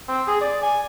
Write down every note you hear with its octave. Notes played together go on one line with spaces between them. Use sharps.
C4
G#4
D5
G#5